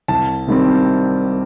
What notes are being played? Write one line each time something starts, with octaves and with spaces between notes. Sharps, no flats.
C2 A5
C3 D#3 G3 C4